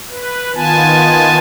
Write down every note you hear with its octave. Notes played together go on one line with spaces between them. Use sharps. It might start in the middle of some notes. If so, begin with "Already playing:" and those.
B4
D#3 B3 F4 G#5 A5